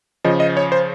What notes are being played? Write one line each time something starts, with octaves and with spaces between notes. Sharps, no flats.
C#3 F3 D#5
D#5
C#5
C5